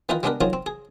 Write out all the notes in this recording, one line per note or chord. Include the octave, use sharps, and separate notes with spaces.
D#3 E3 D#4 F4 A#4 B4
G3 G#3 B3 D4 A#4 B4
F#3 C4 D#4 F4 G#4 A#4
C4
G#4